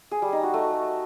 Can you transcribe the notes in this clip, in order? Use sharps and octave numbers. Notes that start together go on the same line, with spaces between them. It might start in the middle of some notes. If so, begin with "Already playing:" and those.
G#4
G3
D#4
F#4
A3